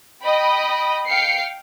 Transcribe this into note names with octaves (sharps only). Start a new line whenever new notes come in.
D#5 G5 B5
F5 G5 C7 C#7